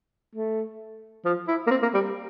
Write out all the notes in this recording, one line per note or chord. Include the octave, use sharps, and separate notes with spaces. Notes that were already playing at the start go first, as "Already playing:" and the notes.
A3
F3
E4
A#3
C4
A#3
G3